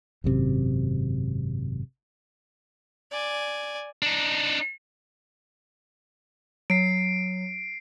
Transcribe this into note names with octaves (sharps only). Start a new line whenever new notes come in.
G#1 F#2 C3
D5 G#5
D4 D#4
F#3 C7 D7